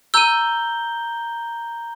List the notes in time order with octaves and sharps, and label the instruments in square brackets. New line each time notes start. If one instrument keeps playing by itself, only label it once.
[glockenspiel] A#5 G6 G7 [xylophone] E6 D#7